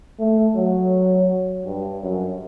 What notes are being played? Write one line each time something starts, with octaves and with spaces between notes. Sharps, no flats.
A3
F#3
G2
F#2